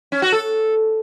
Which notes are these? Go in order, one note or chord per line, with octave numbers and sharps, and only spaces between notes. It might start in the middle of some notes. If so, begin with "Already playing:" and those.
C#4
F#4
A4